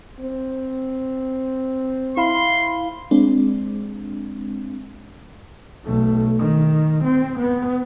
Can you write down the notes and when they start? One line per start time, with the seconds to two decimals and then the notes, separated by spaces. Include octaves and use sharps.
0.20 C4
2.17 E4 F5 B5 C6
3.11 G#3 C4 D4
5.85 B1 A3
6.38 D#3
7.04 C4
7.38 B3